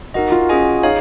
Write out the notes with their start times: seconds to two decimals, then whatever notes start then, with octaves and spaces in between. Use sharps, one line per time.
0.14 D#4 F#4 A#4 D#5
0.32 F4
0.49 C#4 G#4 D#5 G#5
0.83 D#4 G#4 C#5 F5